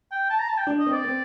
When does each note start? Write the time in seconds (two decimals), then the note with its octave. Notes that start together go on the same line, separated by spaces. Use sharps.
0.12 G5
0.30 A5
0.39 A#5
0.49 A5
0.58 G5
0.67 D4
0.79 D#5
0.87 C4
0.92 D5
1.05 C4